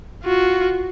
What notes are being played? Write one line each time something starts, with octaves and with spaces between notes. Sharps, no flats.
F4 F#4